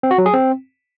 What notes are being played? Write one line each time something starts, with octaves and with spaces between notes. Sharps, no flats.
C4
F#4
F#3
G#4
C4